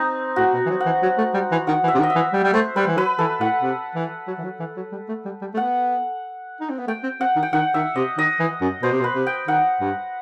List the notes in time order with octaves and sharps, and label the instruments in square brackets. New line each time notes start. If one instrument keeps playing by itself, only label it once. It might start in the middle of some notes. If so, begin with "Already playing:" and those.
Already playing: [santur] C4 D#4
[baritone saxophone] A2 [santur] F#4
[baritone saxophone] B2
E3
F#3
[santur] F#5
[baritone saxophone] E3
F#3
A3
G3
E3
[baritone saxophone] D#3 [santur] F#5
[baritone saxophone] E3
[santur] E5
[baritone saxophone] C3
D#3
[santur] D#5
E5
[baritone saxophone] E3
G3
G3
[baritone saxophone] A3 [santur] C5
[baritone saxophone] G3 [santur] B4
[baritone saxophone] E3
[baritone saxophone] F#3 [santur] B4
[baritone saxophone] E3 [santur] A4
[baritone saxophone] A2 [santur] F#5
[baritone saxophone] C3
E3
F#3
E3
F#3
E3
F#3
G3
A3
G3
G3
A3
[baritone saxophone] B3 [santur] F#5
[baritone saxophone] D#4
C4
B3
[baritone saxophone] A3 [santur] G5
[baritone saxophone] C4
[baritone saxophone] C4 [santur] F#5
[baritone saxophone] D#3
[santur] G5
[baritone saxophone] D#3 [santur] F#5
[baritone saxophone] D#3 [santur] E5
[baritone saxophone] C3 [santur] D#5
[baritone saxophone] D#3 [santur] D#5
[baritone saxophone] E3
F#2
[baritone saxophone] B2 [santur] C5
[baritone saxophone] C3
B2
[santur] B4
[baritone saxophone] C3
[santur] G5
[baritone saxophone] D#3 [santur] F#5
[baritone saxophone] G2